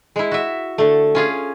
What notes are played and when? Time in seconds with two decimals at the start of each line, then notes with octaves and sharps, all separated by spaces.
0.16 G#3 E4
0.31 F#4 E5
0.78 D3 A3
1.15 C#4 F4 G#4